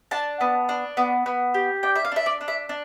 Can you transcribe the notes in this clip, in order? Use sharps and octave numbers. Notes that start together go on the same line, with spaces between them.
D4 A5
B3
D4
B3
B3
G4
D4 G5
E5
F5
D4 E5
D5
D4
E5
D4